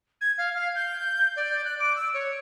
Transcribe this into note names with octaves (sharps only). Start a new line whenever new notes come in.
G#6
F5
F5
G6
D5
F#6
D6
E6
C#5